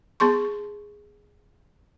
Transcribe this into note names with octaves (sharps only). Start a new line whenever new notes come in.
B3 G#4 C6 C#6